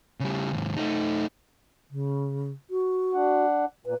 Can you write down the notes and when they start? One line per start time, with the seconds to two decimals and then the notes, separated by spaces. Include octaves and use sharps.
0.20 C#3 G3
0.53 D#2 G#2
0.77 A3 D#4
1.91 C#3
2.70 F#4
3.14 D4 F#5
3.86 A#2 B4